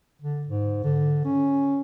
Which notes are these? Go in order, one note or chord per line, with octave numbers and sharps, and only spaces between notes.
D3
G#2
D3
C#4